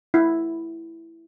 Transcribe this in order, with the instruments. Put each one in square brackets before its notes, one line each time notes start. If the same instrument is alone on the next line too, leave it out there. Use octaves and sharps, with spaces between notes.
[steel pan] E4